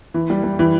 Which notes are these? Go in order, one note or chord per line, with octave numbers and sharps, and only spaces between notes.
E3
G3
G3
E3